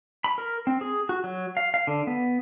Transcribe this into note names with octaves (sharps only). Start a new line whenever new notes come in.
B5
A#4
C4
G#4
F#4
F#3
F5
F5
D3
B3